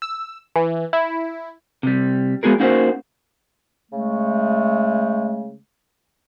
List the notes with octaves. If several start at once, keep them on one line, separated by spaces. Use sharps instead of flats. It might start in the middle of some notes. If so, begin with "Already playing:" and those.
E6
E3
E4
C3 G3
G#3 B3 F#4 G#4 A#4
A#3 C#4 D#4 F#4 A#4 C5
C#3 G#3 A3